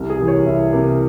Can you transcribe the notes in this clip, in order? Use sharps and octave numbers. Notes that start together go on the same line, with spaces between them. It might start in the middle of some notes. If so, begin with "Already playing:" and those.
Already playing: C2
G#4
C3 E3 A#3
C#5
C2 E5
C3 E3 A#3